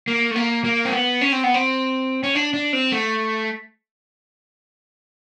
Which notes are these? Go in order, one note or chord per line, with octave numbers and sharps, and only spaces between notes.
A#3
A3
A#3
A#3
C4
B3
C#4
C4
B3
C4
C#4
D4
D4
C4
A3